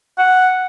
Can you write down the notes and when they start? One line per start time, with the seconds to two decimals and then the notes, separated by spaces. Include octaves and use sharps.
0.18 F#5